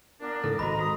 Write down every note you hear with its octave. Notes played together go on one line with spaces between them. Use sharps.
A#2 B3 D4 A#4
G#2 C#3 E3 A4
G#1 G#2 G#3 F#4 D#5 A#5 B5
F#4 D#6